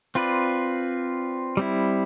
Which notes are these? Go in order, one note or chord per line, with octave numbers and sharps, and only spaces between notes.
C4 F4 B4 D5
G3 C4 E4